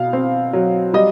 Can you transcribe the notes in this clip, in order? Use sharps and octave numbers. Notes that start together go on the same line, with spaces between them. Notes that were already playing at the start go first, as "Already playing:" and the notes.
Already playing: B2 F5
C4
F#3
G3 D#5